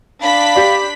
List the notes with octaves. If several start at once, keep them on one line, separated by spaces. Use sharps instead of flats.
D4 F5 B5 B6
G4 D5